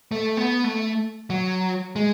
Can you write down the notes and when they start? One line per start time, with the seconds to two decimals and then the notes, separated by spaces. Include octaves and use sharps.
0.11 A3
0.37 B3
0.64 A3
1.30 F#3
1.96 G#3